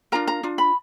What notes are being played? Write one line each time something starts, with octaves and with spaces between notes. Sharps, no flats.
D4 F4 A#4 A#5
A#5
D4 F4
B5